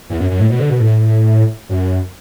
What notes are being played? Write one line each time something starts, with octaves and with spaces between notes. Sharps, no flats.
E2
F#2
F#2
A2
B2
D3
B2
A2
F#2